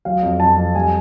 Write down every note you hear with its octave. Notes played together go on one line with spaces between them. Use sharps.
F#3 F5
F2
F2 A5
F2
G3 G#5